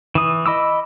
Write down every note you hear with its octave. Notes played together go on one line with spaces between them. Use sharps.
E3 D#6
D#5 B5 D6 E6